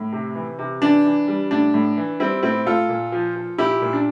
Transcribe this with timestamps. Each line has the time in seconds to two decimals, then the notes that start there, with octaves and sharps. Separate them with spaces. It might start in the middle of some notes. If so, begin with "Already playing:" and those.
Already playing: A2
0.13 C3
0.35 E3
0.59 C3
0.81 E3 D4
1.05 E3
1.28 G3
1.51 A2 D4
1.74 A2
1.97 E3
2.20 G3 C4 E4
2.43 A2 C4 E4
2.66 A2 F4 A4
2.89 A#2
3.12 F3
3.36 F3
3.58 A#2 E4 G4
3.82 A#2
3.93 D4